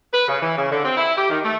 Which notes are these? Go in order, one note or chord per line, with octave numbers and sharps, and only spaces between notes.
B4
C#3
E3
C#3
D3
C4
E4
G4
D#3
A3